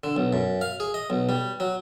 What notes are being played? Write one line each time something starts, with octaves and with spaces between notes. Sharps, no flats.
D3
B1
F#2
F5
G#4
D#5
B1
G3
F#3